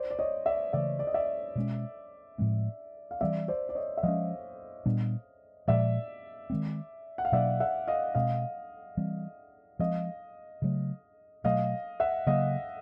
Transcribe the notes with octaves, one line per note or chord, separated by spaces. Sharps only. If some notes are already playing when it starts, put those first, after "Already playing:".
Already playing: C5 D5
D5
C#5 D#5
D5 E5
C#3 E3 A3 D5 E5
D5
D#5
D5 E5
B2 G#3 C#4
A2 F3 G#3 C4
F5
E3 G3 C4 D5 E5
C5 D5
D5
C#5 D#5
E5
F3 G#3 C#4 D#5 F5
A#2 G3 B3 D4
A#2 F3 G#3 D5 E5
D#3 G#3 C4
F#5
F5
B2 F#3 A#3 D4 D5 E5
E5 F#5
D#5 F5
B2 G#3 C4 D#5 F5
E3 G3 C4
F3 G#3 C4 D#5 F5
C#3 F#3 A3
B2 F#3 A3 D#5 F5
E5 F#5
C#3 F#3 A#3 D#5 F5